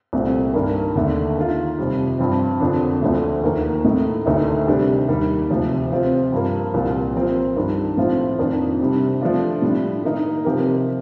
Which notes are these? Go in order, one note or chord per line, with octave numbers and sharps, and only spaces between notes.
C2 A#2 A3 C4
G2 D#3 A#3 D4
D#2 D3 A3
D#3 A#3 F4
F2 C3 G3
G2 F3 C4
F2 D3 F3 A#3 D4
D2 D3 F3 A3
D#2 D#3 A#3
A2 A3 D#4
D2 D3 A3 D#4 A#4
C3 D#3 G3 D4 G4
D#2 D#3 G3
D2 C3 F3
C3 F3 C4 F4 C5
G2 F3 A#3
C2 A#2 F3 A#3 F4
F3 C4 F4 A#4
G2 D#3 G3 D4
A2 F3 C4 F4
F2 D#3 A#3 D4
C3 G3 D4
F3 A3 D4 F4
A2 G3 D4
D#3 A#3 D#4 A#4
C3 F3 C4 G4 A#4